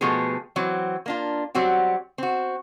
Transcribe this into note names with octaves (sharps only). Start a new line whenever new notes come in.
B2 F3 A3 B3 G4 G#4
E3 F#3 C4
A#3 D4 F4
F#3 G3 C4 F#4 G4
C4 F#4